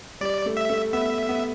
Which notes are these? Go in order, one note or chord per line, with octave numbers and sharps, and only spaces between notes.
G3 D5
A3
E5
A3
B3 E5
B3